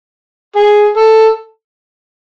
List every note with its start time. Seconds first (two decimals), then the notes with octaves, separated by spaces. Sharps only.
0.56 G#4
0.96 A4